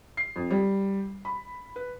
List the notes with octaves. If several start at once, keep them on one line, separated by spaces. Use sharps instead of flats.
C7
F2
G3
B5
B4